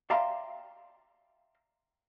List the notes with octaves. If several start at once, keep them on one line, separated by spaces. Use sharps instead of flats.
D5 E5 F5 G5 A#5 C6